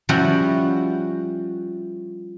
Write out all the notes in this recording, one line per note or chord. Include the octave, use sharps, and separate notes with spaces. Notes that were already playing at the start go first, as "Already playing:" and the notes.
F3 G3 C#4 E4 F#4